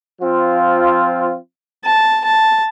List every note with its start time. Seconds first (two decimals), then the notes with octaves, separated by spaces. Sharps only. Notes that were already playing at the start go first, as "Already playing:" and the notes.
0.21 F3 C4 F4
1.84 A5
2.24 A5